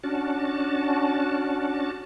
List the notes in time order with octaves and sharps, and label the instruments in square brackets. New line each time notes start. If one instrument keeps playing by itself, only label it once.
[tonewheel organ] C#4 D4 F#4 A5